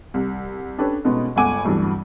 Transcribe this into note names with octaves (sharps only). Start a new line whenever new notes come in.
C2
C#4 D4 G4 A4 B4 C#5
B2 G#3 A3 B3 C#4 D#4
G1 C#2 A4 F#5 G#5 D6
D2 G2 C3 E3 F#3 D4